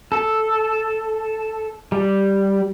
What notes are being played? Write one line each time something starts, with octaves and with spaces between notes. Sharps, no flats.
A4
G3